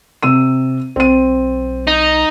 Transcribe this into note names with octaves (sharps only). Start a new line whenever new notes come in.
C3 E6 D#7
B1 C4 D#7
D#4